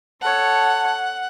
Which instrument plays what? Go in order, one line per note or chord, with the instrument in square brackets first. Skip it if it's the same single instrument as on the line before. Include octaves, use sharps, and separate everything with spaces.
[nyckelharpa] A4 C#5 [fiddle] F#5 [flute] A5